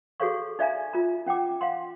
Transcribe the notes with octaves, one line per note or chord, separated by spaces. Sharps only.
F#4 G#4 A4 C#5 F5 C#6
D#4 D5 E5 F5 G#5 A#5
F4 A#5
C#4 F#5 G5 D6
F5 F#5 C6